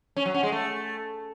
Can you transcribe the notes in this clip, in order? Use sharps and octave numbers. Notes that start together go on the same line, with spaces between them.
C#4
F#3
C#4
G#3
A3